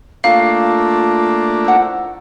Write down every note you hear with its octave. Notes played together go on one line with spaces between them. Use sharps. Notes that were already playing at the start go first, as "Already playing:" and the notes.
A3 A#3 D4 F4 F5
E4 C5 F#5